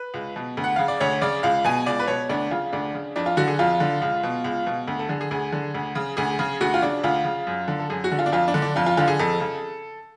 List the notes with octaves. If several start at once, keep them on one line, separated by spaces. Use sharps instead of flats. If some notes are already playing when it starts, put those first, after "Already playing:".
Already playing: B4
C#2
B2
D2
F#5
C#3 F5
D5
D2 C#5
C#3 D5
C#2 F5
B2 G#5
C#2 D5
B4
B2 C#5
D2 D4
C#3 F4
D2 D4
C#3
F2 D4
F4
D3 F#4
G#4
F2 F4
D3
C#2
B2
C#2
B2
D2
A4
D3 G#4
G#4
D2 G#4
D3
D2
C#3
D2 G#4
C#3
D2 F#4
F4
C#3 D4
D2 F4
C#3
F#2
D3
A4
F#2 G#4
F#4
D3
F4
D4
F2 F4
D4
D3
D4
F2 F4
F4
D3 F4
G#4
F2 A4
C#3